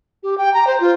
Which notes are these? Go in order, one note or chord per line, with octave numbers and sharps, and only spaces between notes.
G4
G5
A#5
C5
F4